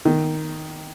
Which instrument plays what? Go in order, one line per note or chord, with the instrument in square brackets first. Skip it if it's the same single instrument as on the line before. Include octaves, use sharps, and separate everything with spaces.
[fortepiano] D#3